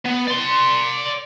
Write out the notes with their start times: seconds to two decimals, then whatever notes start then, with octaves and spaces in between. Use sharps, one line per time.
0.06 B3
0.28 D5 C6